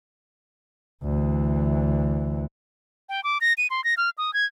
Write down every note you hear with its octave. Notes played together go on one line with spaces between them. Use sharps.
D2 E3
G5
D6
A#6
D#7
C6
A#6
F6
D#6
G#6